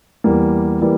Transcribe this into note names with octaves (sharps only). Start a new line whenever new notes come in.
E2 E3 G3 A#3
E3 G3 A#3